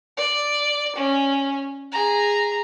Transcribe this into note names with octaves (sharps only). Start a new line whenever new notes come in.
D5
C#4
G#4 A#5